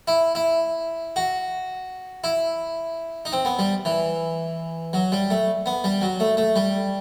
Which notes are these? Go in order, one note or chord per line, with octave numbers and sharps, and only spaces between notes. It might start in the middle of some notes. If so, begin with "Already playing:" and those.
E4
E4
F#4
E4
D#4
C4
B3
G3
E3
F#3
G3
A3
B3
G3
F#3
A3
A3
G3